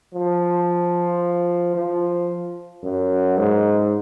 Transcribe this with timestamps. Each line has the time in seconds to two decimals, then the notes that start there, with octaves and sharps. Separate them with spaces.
0.14 F3
1.75 F3
2.83 F#2
3.37 G#2